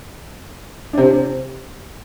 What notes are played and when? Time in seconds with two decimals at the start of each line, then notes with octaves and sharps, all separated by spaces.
0.93 D4
0.98 C3 C4